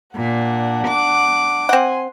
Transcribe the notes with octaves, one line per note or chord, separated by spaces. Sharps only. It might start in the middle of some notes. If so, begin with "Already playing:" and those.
A#2 D4 F#5
D6
C4 F#5 G#5 C6